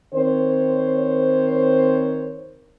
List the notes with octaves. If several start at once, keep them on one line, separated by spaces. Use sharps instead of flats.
D#3 C4 C5 C#5